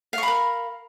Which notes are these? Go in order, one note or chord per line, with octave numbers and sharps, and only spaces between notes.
A#4 F5 B5 C#6